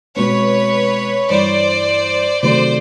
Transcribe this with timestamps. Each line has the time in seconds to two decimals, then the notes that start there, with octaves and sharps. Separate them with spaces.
0.16 B2 G#3 C4 B4 C#5
1.30 G2 E3 G3 C5 D5
2.43 C3 D#3 F#3 A3 C5 D5